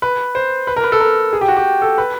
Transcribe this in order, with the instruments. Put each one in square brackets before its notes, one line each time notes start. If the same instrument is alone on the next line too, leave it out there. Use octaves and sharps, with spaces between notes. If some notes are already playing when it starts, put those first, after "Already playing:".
[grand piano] B4
C5
B4
A#4
B4
A4
A#4
G#4
G4
F#4
G4
A4
B4